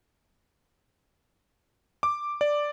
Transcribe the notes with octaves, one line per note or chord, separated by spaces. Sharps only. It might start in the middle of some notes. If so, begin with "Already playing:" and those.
D6
D5